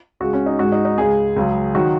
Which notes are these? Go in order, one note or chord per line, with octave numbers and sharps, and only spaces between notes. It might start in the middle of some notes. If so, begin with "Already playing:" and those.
C#2 C#3 G#3 F#4
C#4
D#4
G#2 G#3 F#4
D#4
D#4
C#2 C#3 G#3 G#4
C#2 C#3 F#3
D#3 F#3 F#4